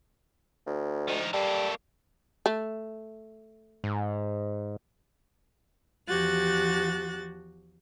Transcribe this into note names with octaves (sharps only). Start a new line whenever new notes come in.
D2
F3 D#4
G3 A#3 A4
A3
G#2
E2 F3 F#4 G4 F#6 A6